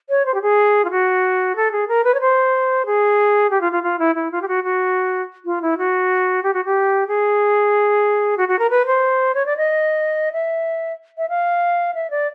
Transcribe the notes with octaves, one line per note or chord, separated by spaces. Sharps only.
C#5
C5
G4
G#4
F4
F#4
A4
G#4
A#4
B4
C#5
C5
G#4
G4
F4
F4
F4
E4
E4
F4
G4
F#4
F#4
F4
E4
F#4
G4
F#4
G4
G#4
F#4
F#4
A#4
B4
C5
C#5
D5
D#5
E5
E5
F5
E5
D5